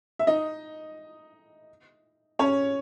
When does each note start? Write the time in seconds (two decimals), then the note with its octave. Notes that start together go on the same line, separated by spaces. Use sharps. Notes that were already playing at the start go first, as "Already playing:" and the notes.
0.19 E5
0.27 D#4 D#5
2.39 C#4 C#5